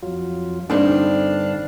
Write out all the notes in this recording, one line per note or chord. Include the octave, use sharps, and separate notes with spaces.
F2 F#3 F4
G2 D3 C4 D4 D#4 F5